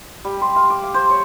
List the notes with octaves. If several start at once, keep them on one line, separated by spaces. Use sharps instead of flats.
G3
C6
F5
D6
F5
C5
C#5